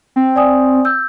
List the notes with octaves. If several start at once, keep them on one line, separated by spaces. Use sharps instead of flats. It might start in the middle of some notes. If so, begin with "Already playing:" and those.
C4
D5 G#5 D#6
E6 G6